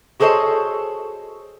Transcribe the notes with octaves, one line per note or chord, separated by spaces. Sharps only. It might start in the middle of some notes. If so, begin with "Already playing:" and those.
F#4 G#4 A4 C5 C#5 D#5